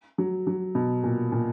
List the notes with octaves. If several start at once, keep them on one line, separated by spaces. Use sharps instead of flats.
F#3
F#3
B2
A#2
A#2